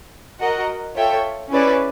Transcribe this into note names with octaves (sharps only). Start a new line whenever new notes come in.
F#4 A#4 D#5 F#5
F4 A4 C#5 E5 G5
C#4 E4 G#4 B4 D5